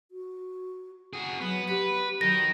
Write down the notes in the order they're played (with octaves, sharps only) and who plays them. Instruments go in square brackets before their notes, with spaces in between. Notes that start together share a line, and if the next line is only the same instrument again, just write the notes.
[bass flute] F#4
[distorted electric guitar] F#4 G#4
[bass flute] F#3 [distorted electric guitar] B3
[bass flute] G4 [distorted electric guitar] B4
[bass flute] F#3 [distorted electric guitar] D#4 A#4 [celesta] A#6